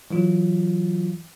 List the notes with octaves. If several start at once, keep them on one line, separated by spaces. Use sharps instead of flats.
E3 F#3 F4